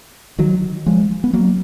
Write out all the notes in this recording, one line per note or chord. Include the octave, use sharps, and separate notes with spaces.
D#3 F#3
F3 G#3
B3
F#3 A#3